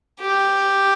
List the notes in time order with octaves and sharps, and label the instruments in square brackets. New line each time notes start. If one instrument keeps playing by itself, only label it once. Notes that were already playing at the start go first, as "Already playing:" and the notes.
[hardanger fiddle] G4